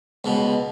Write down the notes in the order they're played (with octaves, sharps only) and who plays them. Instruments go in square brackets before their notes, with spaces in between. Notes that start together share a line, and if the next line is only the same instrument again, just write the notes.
[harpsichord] C#2 B2